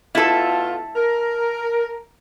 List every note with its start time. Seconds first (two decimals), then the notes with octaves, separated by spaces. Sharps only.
0.15 B2 A3 E4 F4 A4
0.95 A#4